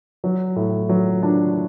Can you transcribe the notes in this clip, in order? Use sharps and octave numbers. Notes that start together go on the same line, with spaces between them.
F#3
A2
F#3
D4